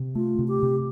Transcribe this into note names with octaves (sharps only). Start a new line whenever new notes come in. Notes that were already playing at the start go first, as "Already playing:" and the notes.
Already playing: C3
A3 F4
C3
G4
C3